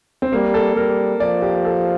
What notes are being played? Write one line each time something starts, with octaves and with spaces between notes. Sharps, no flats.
C4
G3 A#3
A4
G3 A#4
F3 D5
G4
A4